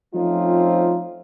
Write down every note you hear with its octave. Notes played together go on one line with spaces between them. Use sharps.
F3 A3 C4 C#4 D#4 F4